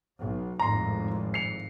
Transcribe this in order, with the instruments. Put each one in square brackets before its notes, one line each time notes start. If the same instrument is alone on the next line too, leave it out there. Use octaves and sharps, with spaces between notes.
[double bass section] B1
[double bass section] G#1 F2 A2 [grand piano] A#5 C6
[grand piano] C7 C#7 F7